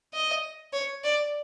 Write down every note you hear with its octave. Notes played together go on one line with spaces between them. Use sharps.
D#5
C#5
D5